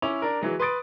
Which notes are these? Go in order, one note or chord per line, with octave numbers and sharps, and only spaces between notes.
C#4 E4 D6 F7
D4 A#4
E3 F#3 G#3
B4 C6 D#6 A6 D7